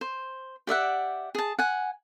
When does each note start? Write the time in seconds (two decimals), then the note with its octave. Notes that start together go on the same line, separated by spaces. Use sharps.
0.01 C5
0.67 G4 D5 E5 F#5
1.35 G#4 A5
1.59 F#5 G#5